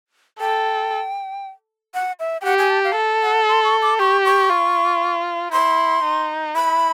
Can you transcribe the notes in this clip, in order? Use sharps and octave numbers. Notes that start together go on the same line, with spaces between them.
A4 G5
F#5
E5
G5
G4 F#5
G#5
A5
F5
A4
F#5
C6
C#6
D6
G4 C#6
C#6
F4
E4 C6
D#4
E4 B5